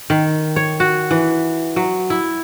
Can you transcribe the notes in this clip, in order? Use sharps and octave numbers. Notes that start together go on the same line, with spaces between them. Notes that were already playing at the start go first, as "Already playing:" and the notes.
D#3
C#5
F#4
E3
F#3
E4